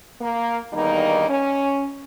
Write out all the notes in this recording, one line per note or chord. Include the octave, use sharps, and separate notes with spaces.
A#3
E2 G2 D#3 G3 A#3 D#4
C#4